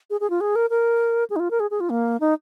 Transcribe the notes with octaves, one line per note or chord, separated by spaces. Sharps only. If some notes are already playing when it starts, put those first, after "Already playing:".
G#4
G#4
F4
G#4
A#4
A#4
G#4
D#4
F4
A#4
G#4
G#4
F4
A#3
D#4